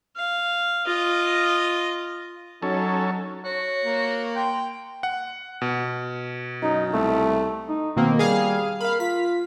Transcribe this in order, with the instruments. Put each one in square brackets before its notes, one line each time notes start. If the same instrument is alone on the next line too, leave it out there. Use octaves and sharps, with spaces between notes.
[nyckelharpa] F5
F4 D#5
[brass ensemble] F#3 D#4 [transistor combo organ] C#4 A4
[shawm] F#4 [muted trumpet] C#5
[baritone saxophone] A#3
[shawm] G5 [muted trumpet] C6
[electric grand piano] F#5
B2
[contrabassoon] F#2 [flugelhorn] D#4
[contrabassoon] C2 [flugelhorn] A3
[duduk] D#4
[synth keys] B2 D#3 A#3 [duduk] C4
[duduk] G3 [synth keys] G#4 F5
[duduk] A#4 [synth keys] F5 B5
[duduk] F4 [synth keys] B6